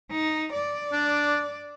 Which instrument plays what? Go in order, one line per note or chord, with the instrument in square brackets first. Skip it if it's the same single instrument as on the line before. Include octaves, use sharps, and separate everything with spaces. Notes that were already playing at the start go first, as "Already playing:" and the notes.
[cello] D#4
D5
[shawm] D4